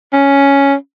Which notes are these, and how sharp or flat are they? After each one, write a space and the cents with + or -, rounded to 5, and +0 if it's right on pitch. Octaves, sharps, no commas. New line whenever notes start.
C#4 +5